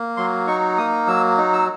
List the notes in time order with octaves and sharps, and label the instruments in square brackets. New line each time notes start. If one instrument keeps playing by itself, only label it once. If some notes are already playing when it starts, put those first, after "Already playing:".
Already playing: [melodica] A#3
F#3 C6
D#4 C#6
A#3 D#6
F#3 E6
D#4
E6